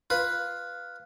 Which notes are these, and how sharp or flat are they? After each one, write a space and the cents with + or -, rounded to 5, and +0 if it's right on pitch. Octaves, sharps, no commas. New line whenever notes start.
F4 +0 B4 +0